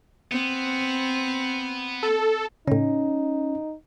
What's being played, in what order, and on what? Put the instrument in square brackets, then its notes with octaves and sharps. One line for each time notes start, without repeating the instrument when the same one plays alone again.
[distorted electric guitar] B3 [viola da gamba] C4
[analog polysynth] A4
[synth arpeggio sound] A2 C#3 [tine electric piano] C#4 [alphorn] D#4